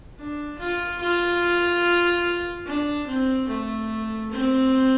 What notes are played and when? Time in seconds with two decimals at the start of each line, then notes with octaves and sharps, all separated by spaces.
0.18 D4
0.58 F4
1.00 F4
2.66 D4
3.07 C4
3.48 A3
4.31 C4